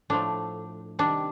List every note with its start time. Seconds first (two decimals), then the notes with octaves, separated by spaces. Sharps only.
0.10 A2 F3 A3 D4
0.99 C3 D#3 G3 D4